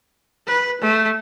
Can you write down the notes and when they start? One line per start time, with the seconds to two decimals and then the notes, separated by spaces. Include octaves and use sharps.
0.47 B4
0.81 A3